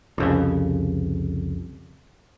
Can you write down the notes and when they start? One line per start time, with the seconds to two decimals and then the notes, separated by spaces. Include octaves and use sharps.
0.18 C2 F2 C#3